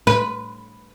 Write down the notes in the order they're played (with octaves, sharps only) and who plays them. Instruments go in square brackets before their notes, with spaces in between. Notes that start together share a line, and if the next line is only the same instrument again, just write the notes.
[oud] B4